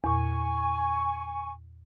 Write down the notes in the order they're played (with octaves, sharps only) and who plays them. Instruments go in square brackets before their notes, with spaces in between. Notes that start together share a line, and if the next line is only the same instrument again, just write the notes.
[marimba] E2 A#2 [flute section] G#5 C#6